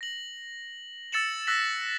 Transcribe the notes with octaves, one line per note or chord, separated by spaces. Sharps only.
A#6 F#7
E6 A6 C#7 E7 F#7
E6 F#6 A#6 B6 F#7